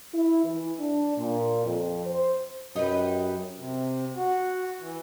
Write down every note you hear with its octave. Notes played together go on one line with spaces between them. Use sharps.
E4
E3
D4
A#2
F2
C5
F#2 D#4 G4 B4
C3
F#4
E3